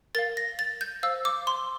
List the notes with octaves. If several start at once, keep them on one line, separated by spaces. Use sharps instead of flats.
A#4 F5 A6
A#6
A6
G6
C5 F5 E6
D6
C6